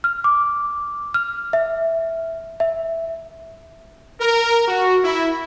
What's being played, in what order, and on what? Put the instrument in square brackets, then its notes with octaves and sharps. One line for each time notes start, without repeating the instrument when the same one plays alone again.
[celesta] F6
D6
F6
E5
E5
[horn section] A#4
F#4
E4